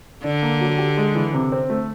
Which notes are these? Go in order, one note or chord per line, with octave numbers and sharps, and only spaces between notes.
D3 D4
A#3
F#3
G4
G#3
E3
C3
C4
A3